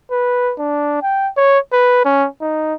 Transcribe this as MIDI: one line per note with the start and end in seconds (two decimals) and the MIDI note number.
0.11 0.54 71
0.59 1.01 62
1.03 1.29 79
1.37 1.59 73
1.73 2.00 71
2.05 2.27 61
2.41 2.74 63